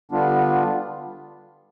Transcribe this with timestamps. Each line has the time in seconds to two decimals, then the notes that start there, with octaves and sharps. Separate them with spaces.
0.11 D3 G3 B3 D4 F4